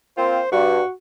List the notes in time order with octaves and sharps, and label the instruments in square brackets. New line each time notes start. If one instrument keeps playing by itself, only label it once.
[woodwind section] A#3 C4 F4 [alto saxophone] C5
[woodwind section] G2 [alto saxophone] F#4